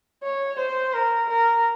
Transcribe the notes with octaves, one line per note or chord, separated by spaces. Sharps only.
C#5
C5
A#4
A#4